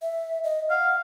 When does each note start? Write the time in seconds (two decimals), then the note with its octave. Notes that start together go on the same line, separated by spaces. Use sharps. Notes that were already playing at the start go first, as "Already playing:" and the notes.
0.02 E5
0.44 D#5
0.70 F5 F#5